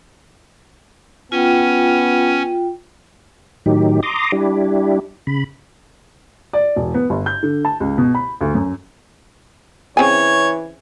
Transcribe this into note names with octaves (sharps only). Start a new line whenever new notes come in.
B3 C#4 F4 G5
A2 D#3 F#3 D#4 G4
A#5 C6 D6 D#6
G3 D4 E4 G4
C#3 B5
D5
E1
B3
G1
G6
D3
A5
C#2
B2
B5
D2
F#2
C#3 E3 C4 C#5 G#5